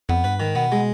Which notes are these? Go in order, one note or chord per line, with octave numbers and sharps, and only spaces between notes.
F2 B3
G2 B4
G#2 D#3
B2 B3
G#3